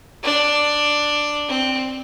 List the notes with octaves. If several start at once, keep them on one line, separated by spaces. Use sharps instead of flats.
D4
C4